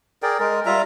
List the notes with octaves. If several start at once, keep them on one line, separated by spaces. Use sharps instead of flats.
G#4 A#4 D5 G5
G#3 A#4
G3 F4 E5 A#5